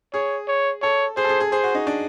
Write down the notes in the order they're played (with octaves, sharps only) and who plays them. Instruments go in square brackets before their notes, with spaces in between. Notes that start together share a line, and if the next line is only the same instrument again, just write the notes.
[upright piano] G#4 [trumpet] C#5
[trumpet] C#5
[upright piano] A4 [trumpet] C#5
[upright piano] G#4 [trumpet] C5
[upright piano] A4
G#4
G#4
[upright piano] G#4 [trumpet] C5
[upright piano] F#4
D#4
D4